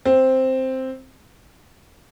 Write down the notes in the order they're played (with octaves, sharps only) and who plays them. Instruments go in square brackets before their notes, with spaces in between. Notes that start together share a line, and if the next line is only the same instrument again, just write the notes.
[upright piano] C4